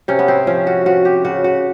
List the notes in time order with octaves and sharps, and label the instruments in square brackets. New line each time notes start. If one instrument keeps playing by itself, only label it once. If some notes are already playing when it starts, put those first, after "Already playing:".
[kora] C3 C#4
B3
C4
F3 C#4
F#4
F3 F#4
G4
C#3 F#4
F#4